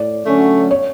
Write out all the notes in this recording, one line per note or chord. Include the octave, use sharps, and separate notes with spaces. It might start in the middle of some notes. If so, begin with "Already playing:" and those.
Already playing: A2 D5
D3 F#3 A3 C#4
C#5